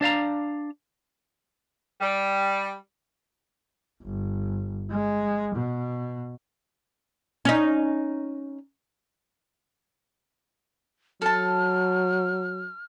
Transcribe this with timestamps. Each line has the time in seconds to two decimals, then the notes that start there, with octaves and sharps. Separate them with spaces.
0.01 D4 D5 F5 A#5
2.01 G3
4.03 G1
4.91 G#3
5.55 B2
7.45 C#4 D#4
11.22 F#3 A4 A5 F6